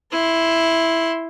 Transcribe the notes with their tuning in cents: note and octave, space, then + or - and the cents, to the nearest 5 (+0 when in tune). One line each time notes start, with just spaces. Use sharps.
E4 +0 C6 +0